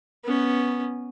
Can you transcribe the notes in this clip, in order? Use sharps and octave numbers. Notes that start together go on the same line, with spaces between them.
B3 C#4